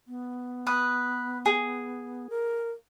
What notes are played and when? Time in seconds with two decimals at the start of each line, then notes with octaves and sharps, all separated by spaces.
0.08 B3
0.67 B4 D#6
1.46 G#4
2.30 A#4